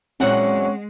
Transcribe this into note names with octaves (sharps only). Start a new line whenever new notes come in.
A#2 E3 F#3 G#3 C4 C#4 F#5